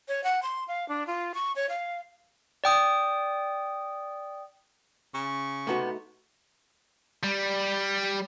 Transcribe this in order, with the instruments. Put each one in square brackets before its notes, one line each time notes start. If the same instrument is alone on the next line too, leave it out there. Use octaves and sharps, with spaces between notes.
[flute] C#5
F#5
C6
F5
D4
F4
C#6
C#5
F5
[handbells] D5 G5 D#6
[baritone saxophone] C#3 [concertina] C#6
[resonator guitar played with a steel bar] C3 B3 [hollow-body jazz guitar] A3 D#4 F#4
[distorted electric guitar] G3